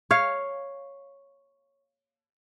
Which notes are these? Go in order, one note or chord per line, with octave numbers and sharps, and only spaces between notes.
C#5 F5